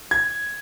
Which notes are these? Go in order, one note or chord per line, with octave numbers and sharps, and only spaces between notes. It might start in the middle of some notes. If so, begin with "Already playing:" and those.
G#6